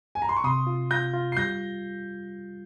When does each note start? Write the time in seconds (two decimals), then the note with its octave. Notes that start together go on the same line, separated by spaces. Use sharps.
0.15 G#5
0.22 A#5
0.29 C6
0.36 C#6
0.44 C3 C6 D#6
0.67 F4
0.91 F4 G6 A#6
1.13 F4
1.32 C7
1.37 G3 G6 A#6